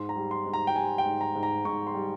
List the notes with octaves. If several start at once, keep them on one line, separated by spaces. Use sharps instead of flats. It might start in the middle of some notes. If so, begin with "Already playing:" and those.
Already playing: G#2 C6
A#5
G3
C6
G#2
A#5
G5
G3 G#5
G5
G#2
A#5
G#2
A#5
G#2 C#6
C6
G3